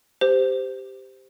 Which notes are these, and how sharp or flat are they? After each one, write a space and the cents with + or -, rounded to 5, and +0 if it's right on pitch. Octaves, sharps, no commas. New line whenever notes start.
G4 +0 C5 -15